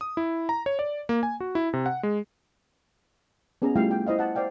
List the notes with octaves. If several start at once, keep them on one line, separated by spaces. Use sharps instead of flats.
D#6
E4
A#5
C#5
D5
A#3
G#5
F#4
E4
C3
F#5
G#3
B3 C#4 G#4 C#5 A#5
G3 A3 E4 F4 F5 G5
G5
E4 C5 D#5 F5
F#5 A5
C5 D5 F5 G5